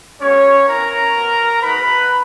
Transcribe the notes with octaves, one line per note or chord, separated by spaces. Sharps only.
G#3 B3 C#4 F#4 C#5
B3 E4 A#4 A#5
B3 F#4
G#3 D#4 F#4 B4 B5